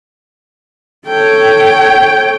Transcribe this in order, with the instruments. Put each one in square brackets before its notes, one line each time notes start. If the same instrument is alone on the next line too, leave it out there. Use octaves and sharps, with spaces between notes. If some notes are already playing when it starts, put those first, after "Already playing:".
[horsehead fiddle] A4 C#5 [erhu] G5